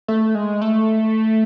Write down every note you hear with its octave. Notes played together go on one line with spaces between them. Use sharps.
A3
G#3
A3